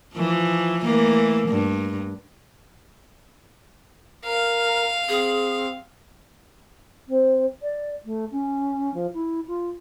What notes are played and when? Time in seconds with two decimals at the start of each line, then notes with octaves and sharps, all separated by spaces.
0.15 E3 F3
0.84 E3 A3 A#3
1.49 G2
4.25 A#4 F5
5.09 C4 G#4
7.08 C4
7.62 D5
8.05 A3
8.31 C#4
8.94 F3
9.14 E4
9.47 F4